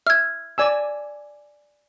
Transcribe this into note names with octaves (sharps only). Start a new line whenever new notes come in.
E5 F6 G#6
D5 G#5 E6